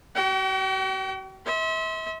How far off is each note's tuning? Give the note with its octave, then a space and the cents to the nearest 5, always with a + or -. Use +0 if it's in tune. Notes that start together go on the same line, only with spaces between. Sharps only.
F#4 +40 G5 -35
E5 -35 C6 +0